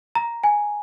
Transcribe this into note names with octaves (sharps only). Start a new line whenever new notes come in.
A#5
G#5